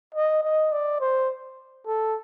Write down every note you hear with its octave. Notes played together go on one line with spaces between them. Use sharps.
D#5
D#5
D5
C5
A4